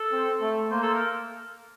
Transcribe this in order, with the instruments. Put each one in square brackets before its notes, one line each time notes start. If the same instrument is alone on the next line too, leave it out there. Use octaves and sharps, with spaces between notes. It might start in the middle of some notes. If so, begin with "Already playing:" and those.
Already playing: [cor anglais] A4
[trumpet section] C4
A3
[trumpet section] A#3 [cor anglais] C5
[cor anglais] A4
A#4